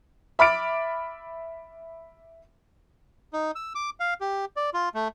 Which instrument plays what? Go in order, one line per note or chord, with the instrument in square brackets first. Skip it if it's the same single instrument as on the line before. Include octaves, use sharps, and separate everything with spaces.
[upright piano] E5 B5 D6 F6 A6 D7
[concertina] D#4
E6
D6
F5
G4
D5
F4
A3